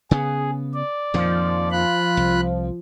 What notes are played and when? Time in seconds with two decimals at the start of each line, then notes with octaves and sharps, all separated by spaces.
0.11 C#3 B3 G#4
0.74 D5
1.14 F2 A#2 D#3 F3
1.71 F4 B5 F#6
2.17 C2